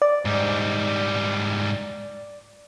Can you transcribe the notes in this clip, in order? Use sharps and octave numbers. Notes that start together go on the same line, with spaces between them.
D5
G#2 G3